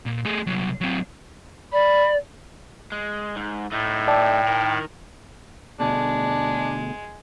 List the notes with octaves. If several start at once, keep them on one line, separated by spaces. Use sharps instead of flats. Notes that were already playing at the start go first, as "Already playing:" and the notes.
A#2
A3 G#4
C2 F#3
F#3 C4
D5 B5
G#3
G#2
A2 A3 D#4
D5 E5 G5 A5
D#3 A#4
D2 B2 G#3 D4